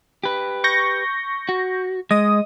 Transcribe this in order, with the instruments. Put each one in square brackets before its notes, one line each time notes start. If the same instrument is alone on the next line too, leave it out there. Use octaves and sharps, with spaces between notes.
[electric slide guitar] G4 B4
[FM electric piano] C#6 G6 A#6
[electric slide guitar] F#4
[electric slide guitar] G#3 [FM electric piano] D#5 D#6